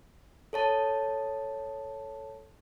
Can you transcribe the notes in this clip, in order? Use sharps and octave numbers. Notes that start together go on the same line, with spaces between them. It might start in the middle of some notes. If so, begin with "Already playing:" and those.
A4 C#5 A5